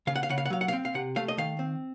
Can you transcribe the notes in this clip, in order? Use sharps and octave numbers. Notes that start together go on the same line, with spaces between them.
C#3 F5
F#5
F5
C#3 F#5
F5
F#5
F#3 F5
F#5
F5
C4
F5
C3 F#5
A3 F5
D#5
D#3 F5
C4